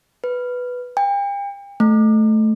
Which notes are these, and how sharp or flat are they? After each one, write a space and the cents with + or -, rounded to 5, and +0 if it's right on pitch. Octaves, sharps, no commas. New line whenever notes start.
B4 +0
G5 +40
A3 -10